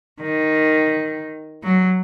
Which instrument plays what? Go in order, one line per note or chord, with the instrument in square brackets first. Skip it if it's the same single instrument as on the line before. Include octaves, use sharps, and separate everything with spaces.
[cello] D#3
F#3